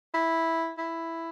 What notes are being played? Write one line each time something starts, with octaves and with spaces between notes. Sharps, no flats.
E4
E4